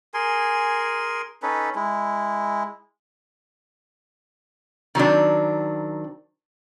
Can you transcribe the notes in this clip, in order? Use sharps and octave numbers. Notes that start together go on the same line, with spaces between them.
G#4 A#4 G#5 C6
C#4 D#4 A4 B4
G#3 E4
D#3 F#3 C4 D4